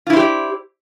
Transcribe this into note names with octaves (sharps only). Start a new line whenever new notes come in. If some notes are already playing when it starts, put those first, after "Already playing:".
E4 F4 G4 C5 D5